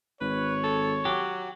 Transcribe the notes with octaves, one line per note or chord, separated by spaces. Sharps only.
G#1 B4 C#5
A4
F#3 G4